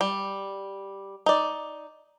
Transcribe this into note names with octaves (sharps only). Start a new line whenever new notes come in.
G3
D#4 D5